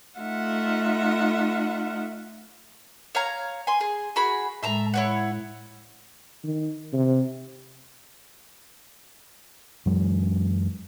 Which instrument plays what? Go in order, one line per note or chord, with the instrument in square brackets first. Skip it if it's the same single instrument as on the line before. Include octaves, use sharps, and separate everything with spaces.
[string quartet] A3 D#4 F4 E5 F#5
[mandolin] C#5 F5 A#5
G#5 C6
G#4
F#4 G#4 B5
[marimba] A2 G#3 [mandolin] E5 A5 A#5
[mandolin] E4 C#5 F#5
[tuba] D#3
C3
[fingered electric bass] F#2 E3 F#3 G#3